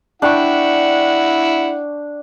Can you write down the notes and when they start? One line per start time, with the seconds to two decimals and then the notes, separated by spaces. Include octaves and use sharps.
0.22 D4 E4 F#5 G5 C#6